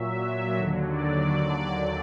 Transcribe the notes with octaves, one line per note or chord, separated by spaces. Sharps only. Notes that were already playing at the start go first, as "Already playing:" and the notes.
Already playing: A#2 F#3 E5
E5
D#2 D3 F#3
D5